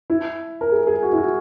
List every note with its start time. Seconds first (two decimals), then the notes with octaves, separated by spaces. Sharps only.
0.10 E4
0.61 A#4
0.72 G#4
0.87 G#4
1.03 F#4
1.13 E4
1.18 F#4